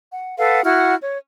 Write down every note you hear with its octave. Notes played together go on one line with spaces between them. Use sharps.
F#5
A4 B4 F5 F#5
E4 F#4 F#5 F6
C#5